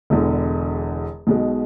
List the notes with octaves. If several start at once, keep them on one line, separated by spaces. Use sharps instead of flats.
E1 E2 D3
B1 B2 G#3